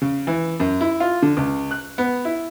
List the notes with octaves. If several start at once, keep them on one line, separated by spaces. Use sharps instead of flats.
C#3
E3
F#2
E4
F4
D3
C#2
F#6
B3
E4